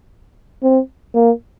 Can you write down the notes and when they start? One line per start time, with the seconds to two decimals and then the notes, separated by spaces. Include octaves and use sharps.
0.63 C4
1.15 A#3